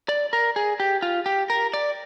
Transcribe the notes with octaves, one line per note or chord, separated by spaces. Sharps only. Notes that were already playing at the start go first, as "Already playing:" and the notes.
D5
A#4
G#4
G4
F4
G4
A#4
D5